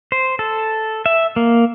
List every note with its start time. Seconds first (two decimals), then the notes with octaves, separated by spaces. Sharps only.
0.12 C5
0.39 A4
1.06 E5
1.36 A#3